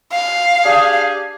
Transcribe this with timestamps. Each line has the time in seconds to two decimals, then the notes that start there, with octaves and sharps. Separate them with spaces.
0.12 F5
0.65 D4 G4 G#4